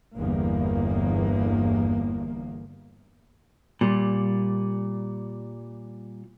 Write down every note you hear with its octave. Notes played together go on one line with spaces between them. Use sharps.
G1 E2 A#3
A#2 G3